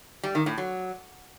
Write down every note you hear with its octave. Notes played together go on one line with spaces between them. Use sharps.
G3
D#3
A2
F#3